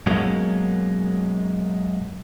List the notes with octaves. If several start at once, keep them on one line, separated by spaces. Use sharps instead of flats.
F#2 B2 F#3 G#3 A#3 C#4